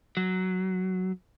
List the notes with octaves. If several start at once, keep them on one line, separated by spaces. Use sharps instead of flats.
F#3